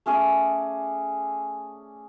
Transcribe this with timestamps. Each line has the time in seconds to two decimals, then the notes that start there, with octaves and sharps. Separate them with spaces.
0.06 A3 C#4 G#4 D5